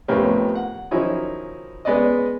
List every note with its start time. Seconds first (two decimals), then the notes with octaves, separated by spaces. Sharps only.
0.08 F2 A2 B3 C#4 G4 A#4
0.55 F#5
0.91 D#3 F3 F#3 C#4 D#4 E4
1.85 G#3 B3 C#4 D5 D#5